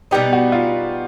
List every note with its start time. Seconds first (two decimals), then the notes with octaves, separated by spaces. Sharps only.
0.11 B2 G3 B3 D#4 G4
0.33 F#4
0.52 F4